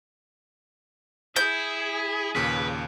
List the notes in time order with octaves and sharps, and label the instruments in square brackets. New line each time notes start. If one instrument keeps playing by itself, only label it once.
[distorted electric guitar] E4 [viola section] G#4 [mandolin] G6
[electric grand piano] D#2 A#2 C#3 [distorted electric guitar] B4